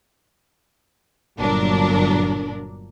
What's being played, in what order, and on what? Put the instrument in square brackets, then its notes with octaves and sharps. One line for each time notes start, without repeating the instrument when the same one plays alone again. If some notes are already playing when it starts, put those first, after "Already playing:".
[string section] G1 A#2 F#3 D4 A#4